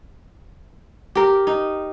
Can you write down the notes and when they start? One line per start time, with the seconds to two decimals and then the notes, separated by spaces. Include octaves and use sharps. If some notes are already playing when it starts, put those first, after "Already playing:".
1.15 G4 A#4
1.47 D#4